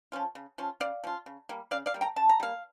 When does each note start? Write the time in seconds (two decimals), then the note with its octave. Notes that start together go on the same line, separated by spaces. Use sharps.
0.12 F3 C#4 F4
0.35 C#3
0.58 F3 C#4 F4
0.80 C#3 D5 F5
1.04 F3 C#4 F4
1.26 C#3
1.49 G3 A#3
1.71 C#3 D5 F5
1.86 D5 F5
1.94 G3 A#3
2.01 G5 A#5
2.16 C#3 A5
2.29 A#5
2.40 G3 A#3 F5